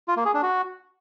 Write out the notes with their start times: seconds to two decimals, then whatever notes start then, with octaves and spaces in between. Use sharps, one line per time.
0.08 F4
0.17 A#3
0.25 G#4
0.34 D4
0.43 F#4